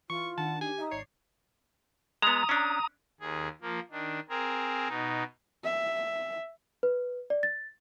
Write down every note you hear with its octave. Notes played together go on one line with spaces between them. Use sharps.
E3 F4 C#6
D#3 D4 F#5 A5
G4 G#5
D#4 E5 D#6
G#1 C#5 D5 C7
G#3 B3 A#5 D#6
C#4 D4
D#2 G#4
F3 A#3
D#3 D4
C4 G#4 A#4
B2 D#4
E5
B4
D5
A6